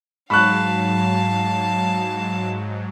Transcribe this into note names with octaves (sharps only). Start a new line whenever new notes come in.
G#2 F#3 F5 A5 B5 C#6 F#6